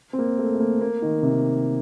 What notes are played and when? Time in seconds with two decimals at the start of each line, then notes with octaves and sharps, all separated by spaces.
0.13 C4
0.19 A#3
0.39 A3
0.55 A3
0.60 A#3
0.81 A#3
1.02 D#3
1.23 C3